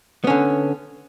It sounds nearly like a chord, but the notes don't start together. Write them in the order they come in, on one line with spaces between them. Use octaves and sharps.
B3 C#4 D3